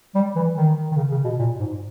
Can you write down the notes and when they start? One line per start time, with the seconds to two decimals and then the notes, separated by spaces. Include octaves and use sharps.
0.15 G3
0.36 E3
0.56 D#3
0.92 D#3
0.97 C#3
1.12 C#3
1.25 B2
1.39 A#2
1.60 G#2